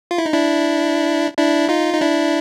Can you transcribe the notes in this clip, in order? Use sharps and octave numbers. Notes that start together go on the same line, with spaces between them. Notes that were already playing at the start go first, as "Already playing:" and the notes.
F4
E4
D#4
D4 E4
D4 E4
D#4 F4
D#4
D4 E4